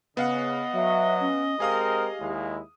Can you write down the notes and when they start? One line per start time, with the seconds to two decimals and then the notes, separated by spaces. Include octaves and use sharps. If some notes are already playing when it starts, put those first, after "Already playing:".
0.17 C#3 B3 D#5 F5 F#5
0.74 F#3 E5
1.21 C#4
1.60 G#3 C4 G4 G#4 A#4 F5 D#6
2.20 D#2 G#3 E4